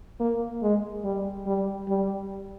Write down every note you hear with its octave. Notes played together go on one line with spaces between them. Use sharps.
A#3
G#3
G3
G3
G3